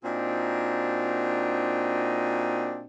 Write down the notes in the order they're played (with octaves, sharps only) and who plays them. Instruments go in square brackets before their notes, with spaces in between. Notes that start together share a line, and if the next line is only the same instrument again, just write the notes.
[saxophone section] A#2 C4 D4 D#4 F#4